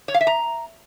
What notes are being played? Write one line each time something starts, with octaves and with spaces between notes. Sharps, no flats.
C#5
F5
E5
A#5